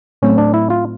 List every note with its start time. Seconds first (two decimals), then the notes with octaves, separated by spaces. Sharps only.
0.22 A2 F#3 A3 C4 C#4
0.38 D4
0.54 E4
0.70 F4